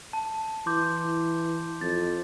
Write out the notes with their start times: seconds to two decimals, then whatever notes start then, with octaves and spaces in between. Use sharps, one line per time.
0.13 A5
0.66 E3 C6 D6 G6
1.81 F2 A6